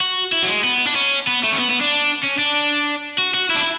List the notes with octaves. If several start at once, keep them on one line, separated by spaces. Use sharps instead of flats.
F#4
E4
F#3
G#3
B3
D4
C#4
B3
A3
C#4
B3
B3
D4
C#4
D4
F#4
F#4
E4
D4
E4